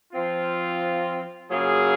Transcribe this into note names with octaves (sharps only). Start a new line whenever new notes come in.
F3 C4 F4
C#3 F#3 A#3 F4 G#4